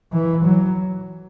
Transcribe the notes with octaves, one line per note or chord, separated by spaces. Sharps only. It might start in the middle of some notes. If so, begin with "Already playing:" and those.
E3
F#3